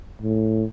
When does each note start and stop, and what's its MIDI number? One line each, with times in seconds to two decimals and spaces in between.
0.22 0.65 45